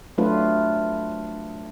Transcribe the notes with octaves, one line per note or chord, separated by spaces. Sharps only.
F#3 A3 C4 D4 F4 B4